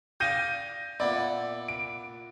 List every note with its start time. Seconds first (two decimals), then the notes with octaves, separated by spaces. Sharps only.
0.20 D5 F5 D#6 G6 A#6 D#7
1.00 A#2 B3 E4 D5
1.68 D7